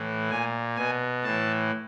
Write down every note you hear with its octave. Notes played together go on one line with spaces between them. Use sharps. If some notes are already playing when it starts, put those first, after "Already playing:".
Already playing: A2 E3
A#2 G#5
B2 G#5
A2 E3 A5